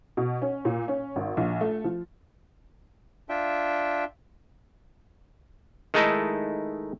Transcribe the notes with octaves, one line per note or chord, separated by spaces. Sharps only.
B2
C#4
A#2
C#4
G#1
A#1
A3
F3
D4 F4 E5 G5
D#3 G#3 A3 D#4 E4 A4